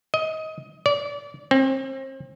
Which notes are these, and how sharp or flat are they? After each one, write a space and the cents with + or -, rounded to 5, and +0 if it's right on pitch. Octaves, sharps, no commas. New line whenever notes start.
D#5 +20
D5 -30
C4 +35